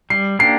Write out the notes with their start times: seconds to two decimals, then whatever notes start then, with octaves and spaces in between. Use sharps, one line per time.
0.10 G3 C7
0.39 A#3 D4 G4 C7